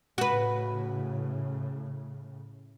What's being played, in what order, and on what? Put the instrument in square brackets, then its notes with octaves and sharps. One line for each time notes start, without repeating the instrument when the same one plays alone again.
[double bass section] A2 C#3 [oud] F#4 B4